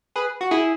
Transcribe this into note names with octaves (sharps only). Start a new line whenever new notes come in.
G#4 B4
F#4
E4 G#4